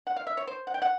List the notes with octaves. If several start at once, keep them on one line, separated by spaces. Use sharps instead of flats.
F#5
F5
E5
C#5
C5
F#5
G5
F#5